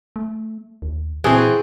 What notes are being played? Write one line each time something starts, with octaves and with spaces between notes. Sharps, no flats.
A3
D#2
A#2 E3 C4 F#4 G#4 A4